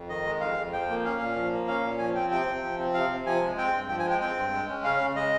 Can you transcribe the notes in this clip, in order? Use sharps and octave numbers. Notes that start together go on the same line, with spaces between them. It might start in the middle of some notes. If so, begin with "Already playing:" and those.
Already playing: F2
D#3 D#5
G#3
F2 F5
F2
F3 G5
A#3
C#4 F5
A#2
F3
A#3
C#4 F5
A#2
F3 G#5
C4 G5
C3 G5
C3
F3
C4
C3 F5
C3
F3 G#5
G#3
C4 G5
G2
F3 G5
G#5
G#3 G5
C4 G5
G2
G#3
C#4
C#3 F5
C#3
G#3 D#5